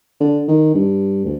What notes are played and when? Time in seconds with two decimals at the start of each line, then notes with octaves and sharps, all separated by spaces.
0.20 D3
0.48 D#3
0.75 G2
1.25 D2